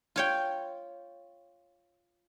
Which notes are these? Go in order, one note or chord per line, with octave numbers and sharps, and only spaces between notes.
F4 C#5 G5